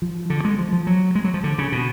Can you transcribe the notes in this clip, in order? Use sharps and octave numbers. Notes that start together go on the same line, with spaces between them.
F3
D3
G#3
F3
F3
F#3
G#3
F#3
F3
D3
C#3
B2